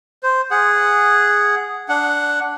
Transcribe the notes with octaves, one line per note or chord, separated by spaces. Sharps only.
C5
G#4 F#5
D4 F#5